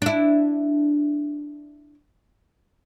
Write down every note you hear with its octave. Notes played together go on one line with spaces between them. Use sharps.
D4 E4